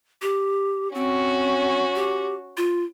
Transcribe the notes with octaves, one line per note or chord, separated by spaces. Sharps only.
G4
C4 C#4 F#4
G4
F4